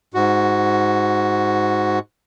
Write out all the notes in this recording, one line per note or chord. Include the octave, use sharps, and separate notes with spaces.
G#2 F#4